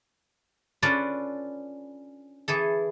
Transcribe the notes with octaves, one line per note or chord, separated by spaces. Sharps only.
C#4 D4 F4 A4 B4 D5
E3 G#4 A4